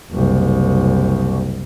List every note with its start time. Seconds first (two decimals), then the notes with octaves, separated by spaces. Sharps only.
0.11 F#1 C2